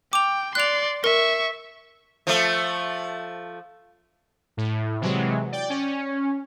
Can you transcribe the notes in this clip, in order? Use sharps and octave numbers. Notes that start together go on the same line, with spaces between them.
G5 D6 F7
D5 C6 F#6 F7
A#4 E5 C#6
F3 A3
A2
C3 E3 F#3 G#3
D5 G5
C#4